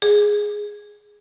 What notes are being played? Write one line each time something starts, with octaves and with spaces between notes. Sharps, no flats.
G#4